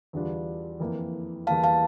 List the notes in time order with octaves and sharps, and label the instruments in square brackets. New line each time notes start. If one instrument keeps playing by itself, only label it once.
[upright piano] E2 D3 G3 D4 F4
F2 E3 A#3 E4
[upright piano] E2 E3 G3 A#3 [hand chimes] F5 A5
[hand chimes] F5 A5